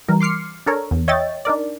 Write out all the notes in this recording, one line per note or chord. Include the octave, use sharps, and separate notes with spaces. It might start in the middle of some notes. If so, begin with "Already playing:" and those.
E3 G3 A#4
C6 D6 F6 C7 C#7
D4 A4 A#4 C#5
E2
C#5 D#5 E5 G5 A6
D4 D#4 A#4 D5